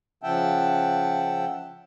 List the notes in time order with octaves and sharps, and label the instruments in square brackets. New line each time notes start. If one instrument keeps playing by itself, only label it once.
[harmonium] C#3 F3 E5 F#5 G5 A5